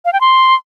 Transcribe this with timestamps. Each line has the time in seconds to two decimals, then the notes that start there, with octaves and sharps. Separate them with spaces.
0.05 F5
0.13 G5
0.21 C6